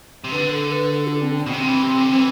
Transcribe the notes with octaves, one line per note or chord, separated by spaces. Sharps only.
C3
D3 B4
A4
B4
A4
D4
C4
C4
B2
C3 C4
D3
E3
C3
D3
E3